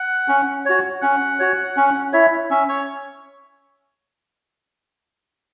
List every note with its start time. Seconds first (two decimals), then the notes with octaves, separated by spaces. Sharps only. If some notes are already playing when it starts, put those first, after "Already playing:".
Already playing: F#5
0.28 C#4
0.66 F#4 C#5
1.03 C#4 F#5
1.39 F#4 C#5
1.77 C#4
2.13 E4 C#5 E5
2.51 C#4 E5
2.69 C#5